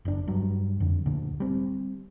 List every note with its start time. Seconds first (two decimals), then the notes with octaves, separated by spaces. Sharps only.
0.05 F#1 D4
0.28 G2 F#3
0.80 F2 D3
1.06 D2 A#2 D3
1.40 G3 C4